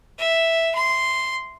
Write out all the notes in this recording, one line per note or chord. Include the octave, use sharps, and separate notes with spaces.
E5
C6